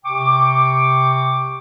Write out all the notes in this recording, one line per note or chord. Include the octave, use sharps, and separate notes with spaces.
C3 G5 C#6 D6